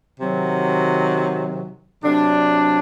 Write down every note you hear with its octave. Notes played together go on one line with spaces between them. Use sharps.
C3 D#3 F#3
C3 F#3 D4